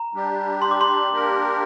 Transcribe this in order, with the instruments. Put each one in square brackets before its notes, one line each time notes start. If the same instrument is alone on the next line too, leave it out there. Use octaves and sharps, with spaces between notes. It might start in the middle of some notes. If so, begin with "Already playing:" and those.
Already playing: [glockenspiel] A#5
[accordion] G3 D4 G4
[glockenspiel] C6
D6
C6
[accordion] A#3 D4 G4 A#4